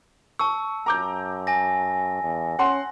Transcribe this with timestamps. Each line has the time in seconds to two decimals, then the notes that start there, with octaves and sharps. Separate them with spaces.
0.39 A5 C#6 E6
0.86 F#2 A#5 D6 G6
1.47 G#5 A#6
2.22 E2
2.59 C#4 F#5 C6